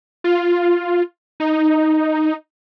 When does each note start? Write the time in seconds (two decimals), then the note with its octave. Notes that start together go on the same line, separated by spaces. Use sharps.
0.24 F4
1.40 D#4